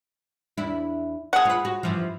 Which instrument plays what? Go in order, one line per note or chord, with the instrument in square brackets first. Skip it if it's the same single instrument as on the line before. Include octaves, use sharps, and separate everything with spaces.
[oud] E2 D4 E4
[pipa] G#4 F#5
[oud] F4 B4
F#4
G2 E3 F3